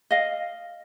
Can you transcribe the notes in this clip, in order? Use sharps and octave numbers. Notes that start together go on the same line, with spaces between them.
D#5 F5